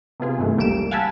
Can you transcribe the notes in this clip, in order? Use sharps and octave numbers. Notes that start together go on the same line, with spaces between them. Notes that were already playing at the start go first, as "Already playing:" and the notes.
C3 B3 F4 G#4
G2 D#3 E3 A3
G1 C#2 G3 A#3 D7 E7
F5 F#5 G#5 A5 B5 E6